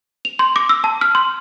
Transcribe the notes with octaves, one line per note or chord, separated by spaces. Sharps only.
F7
C6
D6
E6
A5
F6
C6